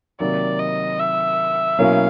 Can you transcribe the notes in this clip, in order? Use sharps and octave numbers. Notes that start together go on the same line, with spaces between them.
C3 D#3 F#3 A#3 D5
D#5
E5
B2 F#3 A#3 C#4 E4 F5